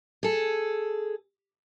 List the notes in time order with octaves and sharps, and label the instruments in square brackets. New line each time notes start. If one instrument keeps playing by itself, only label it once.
[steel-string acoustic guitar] G#4 A4